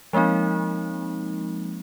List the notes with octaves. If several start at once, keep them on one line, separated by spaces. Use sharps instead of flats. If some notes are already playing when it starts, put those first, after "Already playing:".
F3 G#3 A#3 C4 D#4